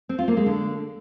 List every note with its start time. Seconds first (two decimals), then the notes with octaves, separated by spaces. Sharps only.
0.09 C4
0.19 F4
0.28 A#3
0.37 G#3
0.46 D3